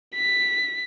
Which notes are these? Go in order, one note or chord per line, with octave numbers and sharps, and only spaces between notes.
B6